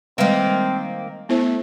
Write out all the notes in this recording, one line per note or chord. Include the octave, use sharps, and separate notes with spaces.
D#3 G3 G#3 A#3 C4 B4
A3 B3 E4 C5